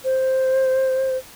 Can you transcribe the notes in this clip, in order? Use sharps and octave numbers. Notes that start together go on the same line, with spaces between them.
C5